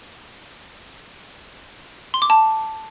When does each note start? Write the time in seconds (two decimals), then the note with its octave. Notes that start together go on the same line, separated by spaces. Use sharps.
2.14 C6
2.22 D6
2.30 A5